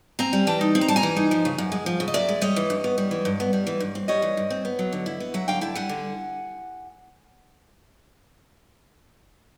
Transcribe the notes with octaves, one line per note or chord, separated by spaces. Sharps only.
C4 G#5 A#5
G3
E3 G5 A5
D#4
C4
A#5
G3 A5
G#5 A#5
E3
D#4
F3
C#3
F#2
G#3
F3
C#3
D#5
F#2 D5 E5
G#3
G3 C#5 D#5
E3
G2
B3
G3
E3
G2
B3
G3
E3
G2
C4
G3 C#5 D#5
E3
G2
C4
B3
F#3
D3
E4
B3
F#3 E5 F#5
D3 F5 G5
E4 G5 A5
G3 F#5 G#5
D3